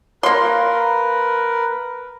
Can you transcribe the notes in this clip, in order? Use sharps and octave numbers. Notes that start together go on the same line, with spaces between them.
A#3 A#4 B4 C6